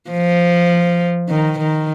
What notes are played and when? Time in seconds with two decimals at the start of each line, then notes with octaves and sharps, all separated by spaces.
0.10 F3
1.29 D#3
1.59 D#3